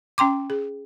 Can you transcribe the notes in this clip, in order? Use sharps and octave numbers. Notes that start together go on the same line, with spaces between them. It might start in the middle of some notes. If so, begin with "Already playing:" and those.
C#4 G5 C6 D6
G#4